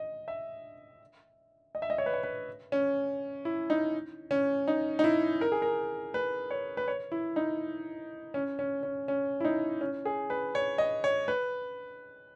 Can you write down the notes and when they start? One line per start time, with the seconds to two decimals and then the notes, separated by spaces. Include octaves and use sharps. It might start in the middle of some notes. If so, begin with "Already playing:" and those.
Already playing: D#5
0.28 E5
1.75 D#5
1.82 E5
1.90 D#5
1.98 C#5
2.06 B4
2.14 C#5
2.23 B4
2.72 C#4
3.45 E4
3.70 D#4
4.31 C#4
4.68 D#4
4.99 D#4
5.04 E4
5.41 A#4
5.52 G#4
5.62 A#4
6.14 B4
6.51 C#5
6.77 B4
6.88 C#5
7.12 E4
7.36 D#4
8.34 C#4
8.59 C#4
8.83 C#4
9.08 C#4
9.40 E4
9.45 D#4
9.81 C#4
10.05 G#4
10.30 B4
10.55 C#5
10.78 D#5
11.04 C#5
11.28 B4